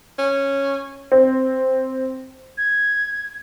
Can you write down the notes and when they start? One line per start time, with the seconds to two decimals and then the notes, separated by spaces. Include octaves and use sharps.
0.18 C#4
1.12 C4
2.57 G#6